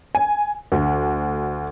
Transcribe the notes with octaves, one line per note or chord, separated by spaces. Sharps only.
G#5
D2